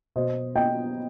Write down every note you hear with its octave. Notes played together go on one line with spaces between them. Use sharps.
B2 C5 D#5
B3 D#5 G5